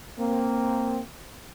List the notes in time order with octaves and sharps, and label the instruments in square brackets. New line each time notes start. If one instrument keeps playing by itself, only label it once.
[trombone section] A#3 C4